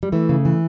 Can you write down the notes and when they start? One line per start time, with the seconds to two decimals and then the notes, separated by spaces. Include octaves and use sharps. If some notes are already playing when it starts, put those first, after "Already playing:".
0.03 G3
0.12 E3 A3
0.29 C#3
0.45 E3